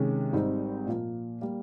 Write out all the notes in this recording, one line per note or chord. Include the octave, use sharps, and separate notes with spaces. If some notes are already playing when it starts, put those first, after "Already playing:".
Already playing: C3 D#3 G#3 C#4 G#4
G#1 G#2 G3 C4 D#4
A#2 F3 A#3
G3 A#3